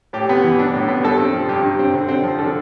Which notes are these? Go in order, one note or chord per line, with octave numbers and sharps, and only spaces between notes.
A2 G4
B3
E3
D4
A2
B3
G2 A4
C4
F3
G2 G4
G2
C4
D3
C4
F3
D3 A4